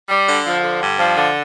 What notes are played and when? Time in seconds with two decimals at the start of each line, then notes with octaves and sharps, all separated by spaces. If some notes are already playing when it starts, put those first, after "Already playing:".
0.09 G3
0.28 D3
0.45 F3
0.63 D3
0.81 G2
0.98 F3
1.17 D3